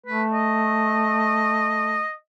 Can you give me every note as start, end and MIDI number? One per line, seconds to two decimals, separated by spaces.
0.07 2.02 57
0.07 0.23 71
0.33 2.12 75